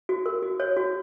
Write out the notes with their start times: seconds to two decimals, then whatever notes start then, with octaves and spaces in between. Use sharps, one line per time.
0.09 F#4
0.26 A#4
0.42 F#4
0.60 C#5
0.77 F#4